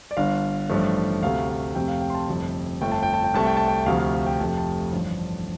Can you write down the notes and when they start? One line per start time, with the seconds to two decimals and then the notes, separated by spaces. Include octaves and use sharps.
0.11 D5
0.17 G1 G2 D3 F5
0.69 A1 G2 F3 A3
1.22 D2 C3 A3 F5
1.49 F5
1.75 F2 C3 A3 G5
1.88 F5
2.02 G5
2.10 C6
2.15 A5
2.28 G1 F2 C3 A3
2.81 G1 F2 F3 A3 G5
2.92 A5
3.03 G5
3.14 A5
3.24 G5
3.34 C2 C3 A3 A5
3.46 G5
3.57 A5
3.68 G5
3.86 D2 C3 F3 A3 F5
4.00 F5
4.13 F5
4.26 G5
4.40 F1 F2 C3 F3 A3 A5
4.49 G5
4.57 A5
4.92 A1 G2 D3 F3